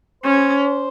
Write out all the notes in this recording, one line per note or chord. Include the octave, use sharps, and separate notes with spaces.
C#4 C5